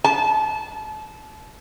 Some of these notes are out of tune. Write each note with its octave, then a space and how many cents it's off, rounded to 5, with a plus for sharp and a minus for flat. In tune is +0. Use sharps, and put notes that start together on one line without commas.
A5 -30